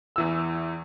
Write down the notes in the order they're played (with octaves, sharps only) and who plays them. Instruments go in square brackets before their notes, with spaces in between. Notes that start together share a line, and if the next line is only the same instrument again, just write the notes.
[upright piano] E2 E3 E6